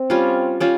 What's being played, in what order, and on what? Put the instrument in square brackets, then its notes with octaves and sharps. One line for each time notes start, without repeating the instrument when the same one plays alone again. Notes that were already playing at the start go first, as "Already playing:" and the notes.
Already playing: [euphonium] C4
[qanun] G3 C#4 F4
G3 C#4 F4